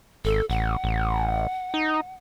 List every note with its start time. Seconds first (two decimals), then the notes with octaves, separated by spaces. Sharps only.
0.25 G#1 A4
0.50 A1 F#5
0.84 A1
1.74 D#4